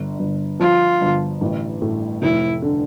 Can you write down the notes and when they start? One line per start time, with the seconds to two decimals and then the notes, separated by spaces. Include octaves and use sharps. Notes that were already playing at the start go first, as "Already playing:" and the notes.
Already playing: G1 D3
0.19 G1
0.59 F3 F4
1.01 G1
1.41 A1
1.82 A2
2.22 F1 E4
2.62 D3